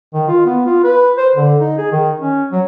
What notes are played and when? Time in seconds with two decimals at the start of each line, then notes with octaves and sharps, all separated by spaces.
0.14 D#3
0.28 F4
0.46 B3
0.66 F4
0.84 B4
1.18 C5
1.36 D3
1.60 D#4
1.78 G#4
1.92 D#3
2.20 C#4
2.52 F#3